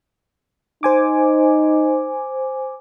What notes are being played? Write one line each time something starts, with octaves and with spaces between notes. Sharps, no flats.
D#4 C5 G#5 D6